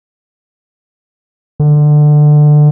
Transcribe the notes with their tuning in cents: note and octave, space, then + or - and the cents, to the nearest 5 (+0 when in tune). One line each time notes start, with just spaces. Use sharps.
D3 +20